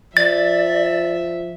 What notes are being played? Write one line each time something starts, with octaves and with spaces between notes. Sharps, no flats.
F3 D5 E5 A6